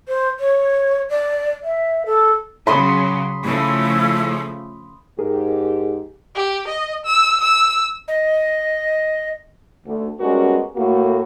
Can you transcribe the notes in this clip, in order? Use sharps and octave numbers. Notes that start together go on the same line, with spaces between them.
C5
C#5
D5
E5
A4
C#3 F#3 B5 C6 D#6
C#3 F3 A3 E4
G#2 G4 G#4 A#4
G4
D#5
E6
E6
D#5
D2
G3 G#3 B3 C#4 F#4 A#4
A2 A3 A#3 F#4